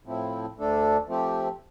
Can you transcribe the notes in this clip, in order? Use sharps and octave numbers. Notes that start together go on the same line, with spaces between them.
A2 F3 C4 E4
D2 D3 A3 D4 A4
F3 A3 C4 G4